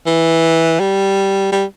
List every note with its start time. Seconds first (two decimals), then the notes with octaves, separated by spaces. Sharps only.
0.07 E3
0.80 G3
1.52 G3